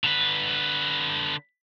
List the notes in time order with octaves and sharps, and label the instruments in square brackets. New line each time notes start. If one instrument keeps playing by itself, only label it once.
[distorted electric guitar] D3 B4